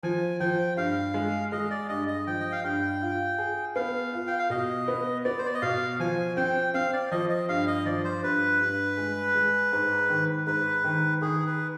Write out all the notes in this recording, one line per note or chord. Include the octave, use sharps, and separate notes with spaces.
F3 G#5
F3 G5
G2 F5
G#3
G#3 D#5
D5
G2 D#5
D#5
F3 G5
D#5
F5
G2 G5
F4
G#4
B3 F5
F4
G5
F5
B2 D#5
B3
B3 D5
C5
D5
D#5
B2 F5
F3 G#5
C4 G5
C4 F5
D5
F3 D#5
D#5
G2 F5
D#5
F3 D5
C5
G2 B4
G2
G#3
G#3
G#2
D#3
G#2 B4
D#3
D#3 G#4
B4